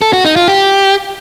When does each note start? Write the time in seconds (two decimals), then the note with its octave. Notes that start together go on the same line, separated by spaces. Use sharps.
0.02 A4
0.13 F#4
0.25 D#4
0.36 F4
0.48 G4